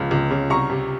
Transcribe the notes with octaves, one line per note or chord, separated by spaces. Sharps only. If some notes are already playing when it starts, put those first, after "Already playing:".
Already playing: C#2 C#3 F3
C#2
C#3
C2 A#5 C#6
C3